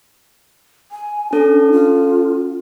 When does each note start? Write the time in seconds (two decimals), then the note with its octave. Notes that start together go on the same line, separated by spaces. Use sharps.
0.92 G#5
1.33 C#4 D4 A4
1.72 F4